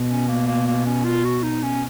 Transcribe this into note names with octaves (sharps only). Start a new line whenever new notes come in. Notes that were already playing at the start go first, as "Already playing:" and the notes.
Already playing: B2
C#4
A#3
A#3
A#3
C#4
F4
F#4
D#4
C#4